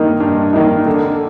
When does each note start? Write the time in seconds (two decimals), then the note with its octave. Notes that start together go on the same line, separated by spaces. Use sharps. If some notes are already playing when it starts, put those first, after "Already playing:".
Already playing: G2 D#3 A#3 D#4
0.20 G2
0.53 D#3 A#3 D#4
0.86 D3